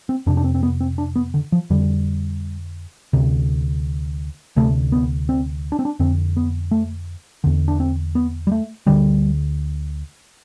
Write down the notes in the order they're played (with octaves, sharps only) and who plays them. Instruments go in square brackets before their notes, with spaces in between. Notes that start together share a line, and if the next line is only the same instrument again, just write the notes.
[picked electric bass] C4
F2 C3 D4
D4
C4
C4
B3
C4
D4
B3
D3
F3
F2 D3 G3
D2 C3
D2 C3 A3
B3
C4
D4
C4
D4
F2 D3 C4
B3
A3
E2 D3
D4
C4
B3
G3
A3
D2 D3 G3